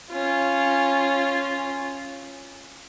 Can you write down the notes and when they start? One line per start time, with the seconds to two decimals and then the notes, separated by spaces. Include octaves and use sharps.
0.10 C#4 F4